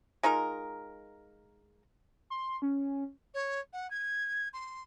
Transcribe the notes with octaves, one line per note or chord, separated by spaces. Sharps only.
G#3 D#4 F4 A#4
C6
C#4
C#5
F#5
G#6
C6